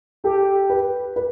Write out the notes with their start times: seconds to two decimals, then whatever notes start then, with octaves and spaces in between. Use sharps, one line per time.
0.24 G4 A4
0.70 B4
1.16 B4